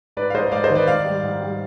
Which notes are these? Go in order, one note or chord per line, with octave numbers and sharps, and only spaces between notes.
G#2 B4 D5
F5
G#2 C5 D#5
G#3 D5 F5
C5 D#5
D#3
B4 D5
G#2 D5 F5
G3
G#2
G3